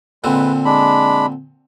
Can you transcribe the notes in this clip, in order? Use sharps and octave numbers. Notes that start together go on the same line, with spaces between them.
A#2 D3 G#3 C4 B4
G#3 D4 B5